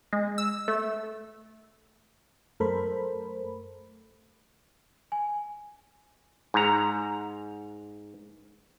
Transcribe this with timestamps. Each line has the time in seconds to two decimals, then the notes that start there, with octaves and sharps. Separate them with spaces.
0.13 G#3
0.38 E6
0.68 A3
2.60 F#2 A3 A4 A#4 C5 B5
5.12 G#5
6.54 G#2 A#5